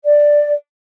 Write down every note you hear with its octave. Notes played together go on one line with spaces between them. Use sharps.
D5